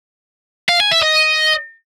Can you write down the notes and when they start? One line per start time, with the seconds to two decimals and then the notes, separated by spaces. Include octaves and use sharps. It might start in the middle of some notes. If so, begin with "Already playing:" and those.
0.69 F5
0.80 G#5
0.91 E5
1.02 D#5